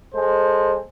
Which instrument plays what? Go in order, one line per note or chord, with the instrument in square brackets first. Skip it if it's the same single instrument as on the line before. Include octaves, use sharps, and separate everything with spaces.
[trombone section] G#3 A4 C5